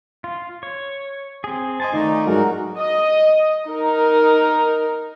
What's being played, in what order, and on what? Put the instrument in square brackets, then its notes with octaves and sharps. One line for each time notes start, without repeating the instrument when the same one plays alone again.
[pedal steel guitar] F4
C#5
C4 G#4
[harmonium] C5 [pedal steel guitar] D#5 G#5 A5
[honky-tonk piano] D#3 [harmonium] A3 D#4 D#5 [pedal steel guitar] F4 D5
[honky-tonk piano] G#2 F#3 G#4 [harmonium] D#4 F#4 A#4
[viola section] D#5
D#4 A#4